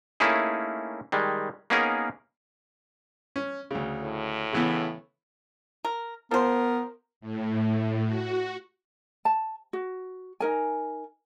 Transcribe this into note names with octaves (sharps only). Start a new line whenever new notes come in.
A3 A#3 C#4 D#4 E4 G#4
D#3 G3 G#3
A#3 B3 C#4 D#4 G#4 A#4
C#4
D2 C#3
A2
C#3 E3 B3
A#4
F3 B3 A#4 C5
A2
F#4
A5
F#4
D#4 A#4 G#5